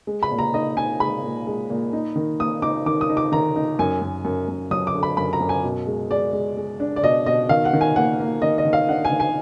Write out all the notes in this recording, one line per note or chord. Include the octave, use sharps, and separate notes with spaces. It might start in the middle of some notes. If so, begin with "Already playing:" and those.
G#3
B5
A#2
A#5
D#4 D#5
D#4 G#5
G#3 B5
A#2
G#3
A#2
D#4
D#3
A#3 D#6
D#4 D6
D#3 D6
D#6
D#4
D6
D#3 A#5
D#4
F#2 G#5
F#2
F#2
F#2
F#3 D#6
D6
D3
B5
F#2 B5
A#5
F#2
G#5
B2
G#3
G#3 D5
G#3
G#3
D4
D5
B2 D#5
B2 D#5
D#3 F5
F#5
D#3
G#5
A#3 F#5
A#3
D#3 D#5
D#5
D#3
F5
D4 F#5
G#5
D#3
G#5